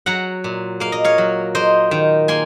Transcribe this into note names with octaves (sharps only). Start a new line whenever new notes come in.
F#3 F#5 A#5
A#2
A#3 F5
D#5
C#5 F5
F#3
A#3 C5 D#5
D#3
A#3 G#5 C6